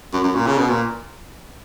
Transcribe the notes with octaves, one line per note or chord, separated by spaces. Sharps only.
F#2
F#2
A#2
C#3
B2
A#2